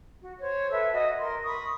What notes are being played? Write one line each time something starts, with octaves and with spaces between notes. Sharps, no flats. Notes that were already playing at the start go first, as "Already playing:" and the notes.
F#4
C5 C#5
A4 B4 E5 E6
F#4 D#5
A#4 C6
B5 C#6 D#6